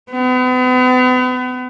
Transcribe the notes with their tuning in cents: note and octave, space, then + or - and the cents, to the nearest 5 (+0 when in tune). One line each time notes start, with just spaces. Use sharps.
B3 +40